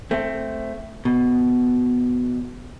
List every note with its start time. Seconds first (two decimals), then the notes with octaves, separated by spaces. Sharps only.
0.11 A3 C4
1.05 B2